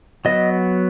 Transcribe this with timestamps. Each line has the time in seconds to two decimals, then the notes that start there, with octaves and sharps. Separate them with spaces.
0.25 F#3 B3 D#5